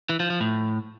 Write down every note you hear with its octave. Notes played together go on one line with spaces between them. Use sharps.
E3
F3
F3
A2